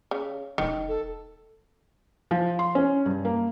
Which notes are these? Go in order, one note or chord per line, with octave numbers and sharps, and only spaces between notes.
C#3
E1 D#3
A4
F3
C6
C#4
G2
A#3